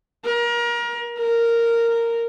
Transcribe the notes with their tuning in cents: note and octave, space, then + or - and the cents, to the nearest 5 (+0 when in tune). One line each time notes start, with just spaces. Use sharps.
A#4 +30
A#4 -10